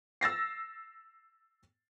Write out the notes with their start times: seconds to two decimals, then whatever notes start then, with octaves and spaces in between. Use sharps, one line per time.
0.21 E6 A6 A#6 C7